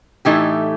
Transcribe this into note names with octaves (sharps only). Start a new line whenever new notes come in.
A2 E3 A3 D#4 G4